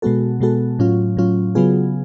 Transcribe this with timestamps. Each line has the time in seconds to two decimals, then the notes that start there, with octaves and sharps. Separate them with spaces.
0.02 B2 G#3 B3 F#4 A4
0.40 B2 G#3 B3 F#4 A4
0.79 A2 F#3 C#4 F4
1.17 A2 F#3 C#4 F4
1.55 C#3 F#3 B3 F4 G#4